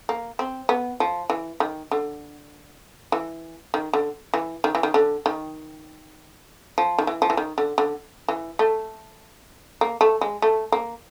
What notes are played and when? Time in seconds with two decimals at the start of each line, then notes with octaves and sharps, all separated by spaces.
0.09 A#3
0.39 C4
0.69 B3
1.00 F3
1.30 E3
1.60 D#3
1.91 D3
3.12 E3
3.74 D#3
3.93 D3
4.34 E3
4.64 D#3
4.75 E3
4.83 D#3
4.94 D3
5.26 D#3
6.78 F3
6.98 D#3
7.07 E3
7.22 F3
7.30 E3
7.37 D#3
7.58 D3
7.78 D3
8.28 E3
8.59 A3
9.81 A#3
10.01 A3
10.21 G#3
10.42 A3
10.72 A#3